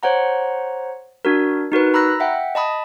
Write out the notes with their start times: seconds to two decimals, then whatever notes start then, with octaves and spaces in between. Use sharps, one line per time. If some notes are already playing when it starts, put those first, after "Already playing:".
0.03 C5 C#5 F#5 A#5
1.25 D4 F#4 A#4
1.72 D#4 F#4 A#4 B4
1.94 A#5 B5 E6 F#6 A#6
2.20 E5 F#5 G5
2.55 D#5 A5 B5 D#6